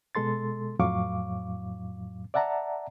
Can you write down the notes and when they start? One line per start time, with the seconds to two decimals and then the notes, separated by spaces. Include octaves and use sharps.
0.15 B2 G#3 A4 C6 A6
0.79 F2 A2 F#3 F5 C#6 D6
2.34 D5 E5 F#5 A5 A#5